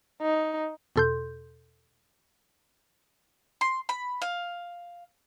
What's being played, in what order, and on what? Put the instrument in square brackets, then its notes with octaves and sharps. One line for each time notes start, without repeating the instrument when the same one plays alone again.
[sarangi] D#4
[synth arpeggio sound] E2 B2 A4 C6 G6
[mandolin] C6
B5
F5